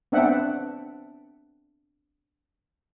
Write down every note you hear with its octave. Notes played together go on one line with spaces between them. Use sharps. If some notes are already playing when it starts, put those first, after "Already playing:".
B3 C4 D4 E5 F#5 G5